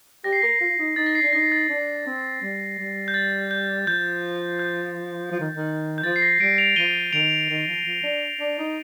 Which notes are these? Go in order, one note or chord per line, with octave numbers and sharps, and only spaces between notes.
G4 A#6
C7
A#4 A#6
F4
F4
D#4
D#4 A6
A#6
C7
D4
D#4 A#6
A6
D4
C4
G3
G3
G6
A6
G6
F3 G6
G6
F3
D#3
D#3
G6
F3 A6
C7
A#6
G3 A#6 D7
D7 F7
F3 D#7 G7
D#3 D7 F7
D#3
F3
F3
D4
D4
D#4